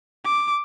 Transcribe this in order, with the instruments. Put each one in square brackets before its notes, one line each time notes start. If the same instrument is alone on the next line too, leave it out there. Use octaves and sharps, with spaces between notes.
[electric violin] D6